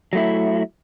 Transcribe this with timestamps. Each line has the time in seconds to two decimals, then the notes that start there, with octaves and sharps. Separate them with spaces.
0.13 F#3 A3 E4